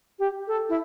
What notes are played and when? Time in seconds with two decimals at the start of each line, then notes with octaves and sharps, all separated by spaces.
0.19 G4
0.48 A4
0.69 E4